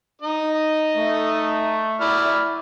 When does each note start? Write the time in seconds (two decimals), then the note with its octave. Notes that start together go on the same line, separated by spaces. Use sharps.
0.21 D#4 D#5
0.97 A3
2.00 E4 D5 F6